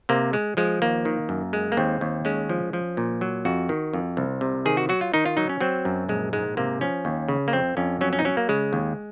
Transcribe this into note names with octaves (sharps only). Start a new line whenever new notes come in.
C3 A#3
G#3
F3 G#3
D#2 A#3
D#3
F#2
G#3
A#3
D#2 C4
D#2
G#3 C#4
F3
F3
A#2
F#3
F2 F#4
D#3
F2
C2
C3
D#3 G#4
F#4
F#3 F#4
F4
D#3 D#4
F4
F#3 D#4
C#4
F#3 C4
F#2
A#1 G#3
G#2 G#3
C3 A#3
F3 C#4
D#2
C#3
A#3
F2 C4
F2 C#4
F#3 C#4
C#4
D#4
F#3 C#4
A#3
C#3 G#3
D#2